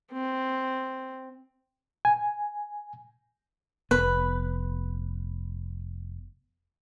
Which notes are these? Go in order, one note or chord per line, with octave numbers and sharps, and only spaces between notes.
C4
G#5
F1 B3 B4